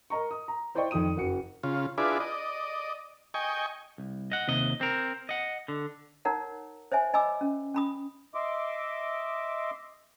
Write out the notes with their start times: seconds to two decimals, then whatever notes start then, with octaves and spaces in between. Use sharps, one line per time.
0.10 A#4 D#5 A#5 C#6
0.31 D#6
0.48 A#5
0.75 E4 C5 D5 D#5 G5 C#6
0.91 F2 D#3 F4 D#6 D#7
1.17 F#1 F#4 C#7
1.63 C#3 F4
1.98 D4 E4 F4 G#4 B4 D5
2.20 D5 D#5
3.34 D#5 G5 G#5 C#6
3.98 C2
4.32 D#5 F#5
4.48 D#2 C3 D#5
4.81 C4 A#4
5.29 D#5 F#5
5.68 D3
6.25 D#4 A#4 C#5 F#5 A#5
6.92 C5 C#5 E5 G#5
7.14 D#5 G#5 B5 D6 E6
7.41 C#4
7.74 C#4 B5 D#6
8.34 D#5 E5 C6 D6